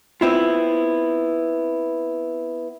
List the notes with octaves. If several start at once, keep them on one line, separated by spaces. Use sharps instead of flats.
B3 C4 E4 F4